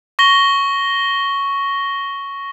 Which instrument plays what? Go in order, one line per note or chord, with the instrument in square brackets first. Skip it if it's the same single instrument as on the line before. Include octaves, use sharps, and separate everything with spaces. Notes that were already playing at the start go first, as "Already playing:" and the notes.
[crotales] C#6 A#6 G7